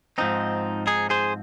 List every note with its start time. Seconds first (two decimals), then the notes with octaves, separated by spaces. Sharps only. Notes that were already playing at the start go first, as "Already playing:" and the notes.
0.18 G#2 F3 C4 D#4
0.87 D#4 G#4
1.10 G#4 C5